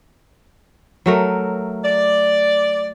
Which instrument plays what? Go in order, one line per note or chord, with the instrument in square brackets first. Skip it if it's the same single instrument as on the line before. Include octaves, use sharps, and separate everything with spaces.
[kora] F#3 A3 A#4
[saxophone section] D5